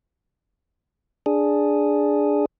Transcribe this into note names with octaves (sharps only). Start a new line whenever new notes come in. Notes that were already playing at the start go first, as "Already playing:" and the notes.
D4 G#4